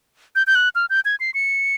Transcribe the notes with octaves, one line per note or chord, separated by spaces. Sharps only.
G6
G6
F#6
F6
G6
G#6
C7
C#7